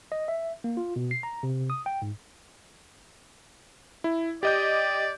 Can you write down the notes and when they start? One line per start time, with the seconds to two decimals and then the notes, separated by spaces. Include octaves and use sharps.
0.12 D#5
0.28 E5
0.64 A#3
0.77 F4
0.96 B2
1.11 C7
1.23 A#5
1.43 C3
1.70 D#6
1.86 G5
2.02 G#2
4.04 E4
4.43 G4 D5 D#5 G6